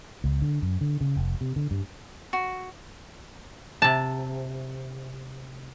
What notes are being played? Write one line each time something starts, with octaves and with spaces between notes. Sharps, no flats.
C#2
D3
F#2
D3
C#3
F1
C3
D3
G2
F#4
C3 A5